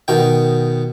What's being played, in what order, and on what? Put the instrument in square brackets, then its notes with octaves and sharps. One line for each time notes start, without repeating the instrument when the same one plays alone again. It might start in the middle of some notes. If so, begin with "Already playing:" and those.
[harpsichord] B2 D#3 G5